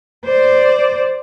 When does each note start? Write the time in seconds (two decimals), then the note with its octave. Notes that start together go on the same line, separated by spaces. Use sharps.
0.24 C5 D5